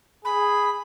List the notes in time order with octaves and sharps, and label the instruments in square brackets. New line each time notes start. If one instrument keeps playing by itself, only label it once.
[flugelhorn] G#4 [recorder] B5